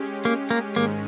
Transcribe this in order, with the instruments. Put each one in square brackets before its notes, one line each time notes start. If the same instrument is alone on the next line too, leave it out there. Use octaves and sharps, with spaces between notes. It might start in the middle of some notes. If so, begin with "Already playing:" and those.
Already playing: [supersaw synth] G#3 C#4 G4
[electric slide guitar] A#3
A#3
[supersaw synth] G#2 D#3 G#3 C#4 [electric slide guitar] A#3